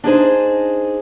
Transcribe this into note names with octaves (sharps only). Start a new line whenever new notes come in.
D4 D#4 G#4 C5